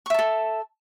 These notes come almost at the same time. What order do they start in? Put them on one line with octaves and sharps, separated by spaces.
C#6 E5 A5 A4